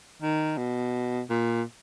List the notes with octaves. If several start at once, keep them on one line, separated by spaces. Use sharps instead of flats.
D#3
B2
A#2